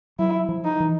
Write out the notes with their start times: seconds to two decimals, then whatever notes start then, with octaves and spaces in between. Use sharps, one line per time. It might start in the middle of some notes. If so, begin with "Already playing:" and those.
0.19 F#3 E4
0.49 F3
0.65 D#4
0.80 E3